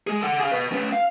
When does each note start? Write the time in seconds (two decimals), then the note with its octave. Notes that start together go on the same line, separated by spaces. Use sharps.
0.07 G#3 G#4
0.22 A4 F#5
0.40 G#4 F5
0.52 B4 D#5
0.72 C#4 B4
0.92 F5